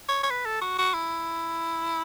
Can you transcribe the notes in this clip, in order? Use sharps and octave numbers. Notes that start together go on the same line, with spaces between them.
C#5
C#5
B4
A4
F#4
F#4
E4